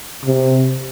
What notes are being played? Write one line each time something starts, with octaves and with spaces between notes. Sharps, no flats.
C3